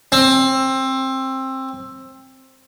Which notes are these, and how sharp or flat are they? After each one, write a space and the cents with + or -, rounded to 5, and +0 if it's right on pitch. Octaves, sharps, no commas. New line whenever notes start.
C4 +20